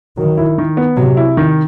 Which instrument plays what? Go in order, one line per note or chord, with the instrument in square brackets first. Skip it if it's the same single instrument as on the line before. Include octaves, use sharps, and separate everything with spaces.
[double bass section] D#3 [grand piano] F#3
[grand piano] E4
D#3
B3
[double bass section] C3 [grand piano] F#3
[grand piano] E4
D#3